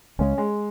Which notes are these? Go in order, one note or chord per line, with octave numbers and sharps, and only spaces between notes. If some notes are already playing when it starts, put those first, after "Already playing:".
C#2 C#3 G#3 C#4
G#3